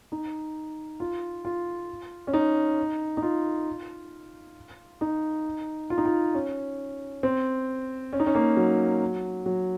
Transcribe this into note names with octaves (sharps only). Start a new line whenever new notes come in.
D#4
F4
F4
C#4
D#4
D#4
F4
D#4
F4
D#4
F4
C#4
C4
C#4
D#4
C#4
A#3
F#3
F#3